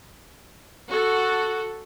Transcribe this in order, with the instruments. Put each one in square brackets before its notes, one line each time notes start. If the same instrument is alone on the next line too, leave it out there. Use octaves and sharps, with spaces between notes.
[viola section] F#4 A4